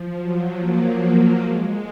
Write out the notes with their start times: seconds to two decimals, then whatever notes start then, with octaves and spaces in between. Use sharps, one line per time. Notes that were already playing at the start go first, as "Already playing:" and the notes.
Already playing: F3
0.16 F#3
0.58 A#3
1.01 A#3
1.43 G#3